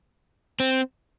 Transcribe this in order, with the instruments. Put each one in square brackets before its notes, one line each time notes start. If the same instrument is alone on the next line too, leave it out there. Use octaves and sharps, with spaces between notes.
[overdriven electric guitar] C4